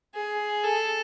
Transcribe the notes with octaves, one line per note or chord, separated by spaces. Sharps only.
G#4
A4